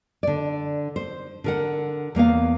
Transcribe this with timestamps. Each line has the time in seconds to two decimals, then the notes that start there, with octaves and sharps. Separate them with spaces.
0.23 D3 D5
0.96 C5
1.44 D3 A#4 F#5
2.15 E2 A#3 B3 F5